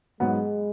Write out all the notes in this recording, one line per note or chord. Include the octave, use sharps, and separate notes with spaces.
G#2 F#3 G#3 B3